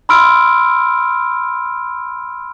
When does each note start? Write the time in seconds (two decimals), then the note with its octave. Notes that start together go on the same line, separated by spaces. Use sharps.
0.09 B5 C6 E6 F6 D7